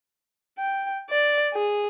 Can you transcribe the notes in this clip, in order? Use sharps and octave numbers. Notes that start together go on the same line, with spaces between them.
G5
D5
G#4